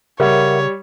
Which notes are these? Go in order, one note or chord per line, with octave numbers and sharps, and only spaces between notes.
C#3 G3 A#4 C#5 E5 F#5